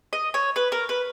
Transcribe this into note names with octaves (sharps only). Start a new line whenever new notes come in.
D#5
C#5
B4
A#4
B4